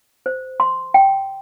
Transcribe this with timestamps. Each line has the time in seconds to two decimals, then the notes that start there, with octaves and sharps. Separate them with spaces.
0.26 C5
0.60 C6
0.94 G5